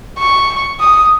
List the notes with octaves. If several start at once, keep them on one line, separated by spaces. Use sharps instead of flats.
C#6
D#6